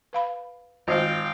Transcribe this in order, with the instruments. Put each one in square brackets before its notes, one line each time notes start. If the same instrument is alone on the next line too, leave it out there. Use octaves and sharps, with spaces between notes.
[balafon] B4 F5 B5
[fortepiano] G#1 [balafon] F4 C5 D#5 [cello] F5 G5